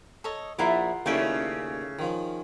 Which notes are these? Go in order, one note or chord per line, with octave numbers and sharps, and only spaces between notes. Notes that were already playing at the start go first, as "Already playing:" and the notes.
A4 C#5 D#5
A#1 E4 F4 A#4 E5 F#5
D#2 C#3 A3 C#4 E4 D5 G5
D#3 F3